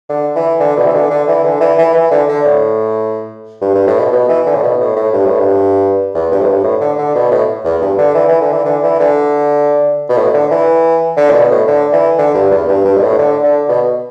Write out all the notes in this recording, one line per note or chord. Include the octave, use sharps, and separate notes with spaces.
D3
E3
D3
B2
E3
D3
D3
E3
D3
E3
E3
E3
D3
D3
A2
G2
G2
A2
B2
B2
E3
D3
A2
B2
A2
A2
G2
A2
G2
E2
G2
A2
G2
A2
D3
D3
B2
A2
E2
G2
D3
E3
E3
D3
E3
D3
E3
D3
B2
A2
D3
E3
D3
A2
B2
A2
D3
E3
D3
G2
E2
G2
G2
B2
A2
D3
D3
B2